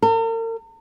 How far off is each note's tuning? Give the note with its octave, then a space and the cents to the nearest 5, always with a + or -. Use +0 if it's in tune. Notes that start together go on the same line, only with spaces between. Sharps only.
A#4 -45